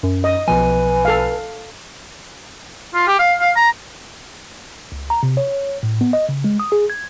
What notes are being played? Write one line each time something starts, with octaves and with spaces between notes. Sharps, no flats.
F#2
D#5
B1 B2 F3 B4 G#5
A4 F5
F4
G4
F5
F5
A#5
C#2
A#5
C3
C#5
A2
B3
D#5
C#3
G#3
D#6
G#4
G#6